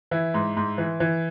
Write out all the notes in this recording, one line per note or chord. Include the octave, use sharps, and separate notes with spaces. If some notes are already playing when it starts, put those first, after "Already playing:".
E3 E4
G#2
G#2
E3
E3